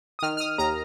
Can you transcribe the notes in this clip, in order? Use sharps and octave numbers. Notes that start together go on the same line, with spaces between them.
D#6
D#3 F6
F6
D#6
D#2 A#5